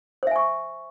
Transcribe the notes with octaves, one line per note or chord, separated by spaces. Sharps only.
C5 E5 G#5 C#6